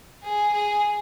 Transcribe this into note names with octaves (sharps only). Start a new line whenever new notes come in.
G#4
G#4